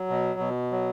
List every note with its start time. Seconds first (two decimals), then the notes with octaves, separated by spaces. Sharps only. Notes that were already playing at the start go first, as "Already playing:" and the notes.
Already playing: F#3
0.09 B2
0.40 B2
0.72 F#3